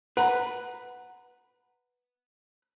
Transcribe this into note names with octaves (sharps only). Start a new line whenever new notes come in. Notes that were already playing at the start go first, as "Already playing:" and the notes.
B4 F#5 A#5 B5